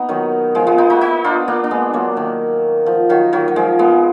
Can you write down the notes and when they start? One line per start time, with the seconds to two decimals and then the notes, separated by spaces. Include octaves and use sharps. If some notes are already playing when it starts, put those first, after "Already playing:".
Already playing: B3 D#4
0.09 D#3 F#3
0.55 F3 G#3
0.67 G#3 B3
0.78 B3 D#4
0.90 D#4 F#4
1.01 D#4 F#4
1.24 D4 F4
1.48 A#3 D4
1.64 D4
1.71 G#3 B3
1.94 F#3 A#3
2.17 D#3
2.86 F3
3.09 D#3 F#3
3.33 D#3 F#3
3.48 F#3
3.56 F3 G#3
3.79 G#3 B3